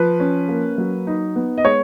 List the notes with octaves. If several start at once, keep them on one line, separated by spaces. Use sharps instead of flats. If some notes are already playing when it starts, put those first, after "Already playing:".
Already playing: F3 B4
C#4
A#3
F#3
D#4
B3
D#5
G#3 C#5